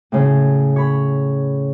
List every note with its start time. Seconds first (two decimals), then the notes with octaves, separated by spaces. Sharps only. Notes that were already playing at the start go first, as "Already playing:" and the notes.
0.12 A2 C#3
0.76 C#5 B5